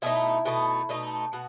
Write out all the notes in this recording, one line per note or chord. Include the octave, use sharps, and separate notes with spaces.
B2 A3 D#4 E4 E5
B2 A3 D#4
B2 A3 D#4
B2 F#4